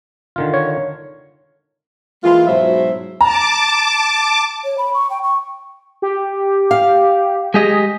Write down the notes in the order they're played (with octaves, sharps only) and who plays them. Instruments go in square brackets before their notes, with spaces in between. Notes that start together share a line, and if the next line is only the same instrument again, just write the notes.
[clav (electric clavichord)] D3 D#3 F4
[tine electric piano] C#5
[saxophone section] E3 G#3 A#3 F4
G#2 B2 F#3 E4 C5 E5
[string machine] A5 D6 [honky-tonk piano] A#5
[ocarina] C#5
B5
C#6
G5
C#6
[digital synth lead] G4
[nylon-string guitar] F5
[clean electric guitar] G#3 G4 D#5 [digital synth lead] G#4